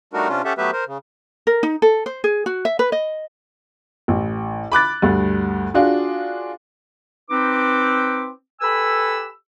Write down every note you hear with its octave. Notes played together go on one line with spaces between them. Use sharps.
G3 A3 D4 D#4 F#4 A#4
C3 C#4 D4 F4
C#4 G4 A4 E5 F#5
F#3 A3 B3 G4 B4 E5
A#4 C5
C#3
A#4
D#4
A4
C5
G#4
F#4
E5
B4
D#5
A1
B5 D6 F#6 A6
D2 G2
D4 F4 F#4 G#4
C4 D#4 B4 D6
G4 A4 B4 G#5 B5 E6